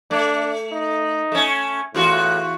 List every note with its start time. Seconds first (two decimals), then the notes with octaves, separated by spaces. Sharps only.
0.11 A3 D4
0.72 D#4
1.32 A3 C#4
1.95 E2 A2 F4 F#4